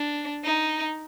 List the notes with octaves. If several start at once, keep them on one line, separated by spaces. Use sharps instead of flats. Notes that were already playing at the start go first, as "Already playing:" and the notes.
Already playing: D4
D#4